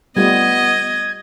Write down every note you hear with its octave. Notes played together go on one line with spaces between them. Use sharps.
G3 A3 B3 F4 D#5 G#6